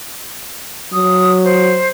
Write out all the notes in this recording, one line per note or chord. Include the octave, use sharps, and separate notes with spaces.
F#3 D#6
C5